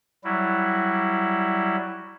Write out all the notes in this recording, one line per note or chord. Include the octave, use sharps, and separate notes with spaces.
F#3 G3 E4